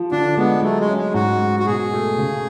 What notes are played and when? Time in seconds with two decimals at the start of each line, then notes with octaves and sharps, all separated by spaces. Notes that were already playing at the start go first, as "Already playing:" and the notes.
Already playing: F3
0.12 D3 D4
0.37 G#3 B3
0.63 F#3 A3
0.80 G#3
0.89 C#4
0.97 G#3
1.14 G#2 F#4
1.40 G#3
1.59 F#4
1.66 B2 G#4
1.93 A3
2.18 C#3